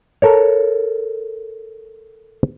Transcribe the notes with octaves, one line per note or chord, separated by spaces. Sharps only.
A4 A#4 C#5